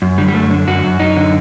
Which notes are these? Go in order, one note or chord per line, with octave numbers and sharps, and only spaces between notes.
F#2
D3 G3
G3
F#2 A3
D3
F#2 F#4
F#2
F#2 D#4
D3